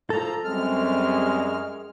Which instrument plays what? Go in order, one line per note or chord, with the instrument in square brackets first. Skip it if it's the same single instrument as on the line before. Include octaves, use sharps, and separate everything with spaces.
[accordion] F3 A#5 [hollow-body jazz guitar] A4
[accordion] F#2 F6 [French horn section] G3 C4 [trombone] G#3